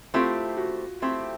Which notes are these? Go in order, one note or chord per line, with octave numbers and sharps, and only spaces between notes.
A3 C4 E4 F4 G4
F#4
A3 C4 E4 G4